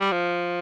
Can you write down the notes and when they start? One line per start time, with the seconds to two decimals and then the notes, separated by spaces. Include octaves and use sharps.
0.01 G3
0.12 F3